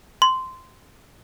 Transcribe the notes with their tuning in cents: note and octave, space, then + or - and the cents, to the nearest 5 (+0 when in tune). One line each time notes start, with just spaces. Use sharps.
C6 -10